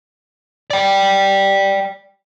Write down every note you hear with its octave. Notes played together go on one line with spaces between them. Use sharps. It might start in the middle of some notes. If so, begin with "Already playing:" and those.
D5 G5